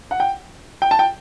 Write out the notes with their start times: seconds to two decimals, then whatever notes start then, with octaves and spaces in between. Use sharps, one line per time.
0.11 F#5
0.20 G5
0.82 G5
0.91 A5
0.99 G5